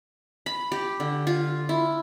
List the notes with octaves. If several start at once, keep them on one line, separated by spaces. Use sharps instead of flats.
B5
G4
D3
F4
E4